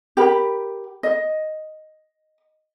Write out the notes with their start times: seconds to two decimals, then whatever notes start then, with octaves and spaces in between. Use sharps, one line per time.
0.17 G4 A#4 G5 B5
1.03 D#5